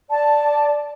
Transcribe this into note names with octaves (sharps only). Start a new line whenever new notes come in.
D5 A5